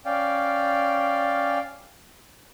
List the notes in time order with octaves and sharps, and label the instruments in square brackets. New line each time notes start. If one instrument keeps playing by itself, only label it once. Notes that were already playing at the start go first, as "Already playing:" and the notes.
[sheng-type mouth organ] C#4 D5 F5 G5